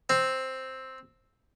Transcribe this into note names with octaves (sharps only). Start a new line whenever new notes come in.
C4